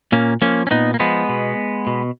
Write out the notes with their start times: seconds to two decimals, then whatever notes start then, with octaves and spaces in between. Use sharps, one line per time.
0.12 A#2 A#3 C#4
0.42 F3 A#3 C#4
0.67 C#4
0.71 A#2 B3 D#4
0.94 A#3
1.00 F3 G#3 B3
1.29 B2
1.87 B2